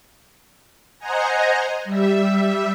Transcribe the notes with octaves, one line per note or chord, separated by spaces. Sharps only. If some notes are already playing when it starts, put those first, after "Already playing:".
C5 D#5 F#5 G#5 A#5
G3 E5